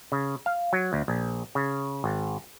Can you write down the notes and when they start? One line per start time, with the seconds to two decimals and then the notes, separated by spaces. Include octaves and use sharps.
0.12 C#3
0.46 F5
0.73 F#3
0.93 D2
1.08 A#1
1.55 C#3
2.04 G#1